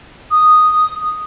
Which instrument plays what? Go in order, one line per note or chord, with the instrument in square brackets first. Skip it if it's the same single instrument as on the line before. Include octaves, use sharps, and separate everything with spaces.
[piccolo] D#6